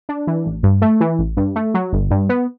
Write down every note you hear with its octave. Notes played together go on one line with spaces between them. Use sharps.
D4
E3
A1
G2
A3
E3
A1
G2
A3
F#3
G1
G2
B3